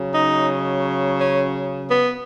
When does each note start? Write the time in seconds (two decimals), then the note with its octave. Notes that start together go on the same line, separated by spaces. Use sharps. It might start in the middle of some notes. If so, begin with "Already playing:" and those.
Already playing: C#3 F#3
0.13 D#4
1.18 C#4
1.88 B3